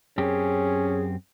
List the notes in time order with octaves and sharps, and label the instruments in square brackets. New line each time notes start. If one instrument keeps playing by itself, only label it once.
[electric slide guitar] F#2 C4 G4 [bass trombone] C#4 [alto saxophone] G#4